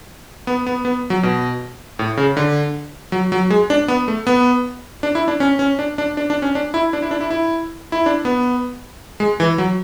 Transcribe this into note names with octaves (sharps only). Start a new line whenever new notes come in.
B3
B3
B3
F#3
B2
A2
C#3
D3
F#3
F#3
G#3
D4
B3
A3
B3
D4
E4
D4
C#4
C#4
D4
D4
D4
D4
C#4
D4
E4
D4
E4
D4
E4
E4
E4
D4
B3
G#3
E3
F#3